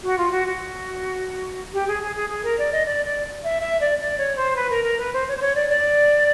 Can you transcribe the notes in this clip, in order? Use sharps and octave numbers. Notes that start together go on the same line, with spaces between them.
F#4
F4
F#4
F#4
G4
G#4
G#4
G#4
G#4
A#4
D5
D#5
D5
D5
E5
E5
D5
D5
C#5
C5
B4
A#4
A#4
B4
C5
C#5
C5
C#5
D5
D5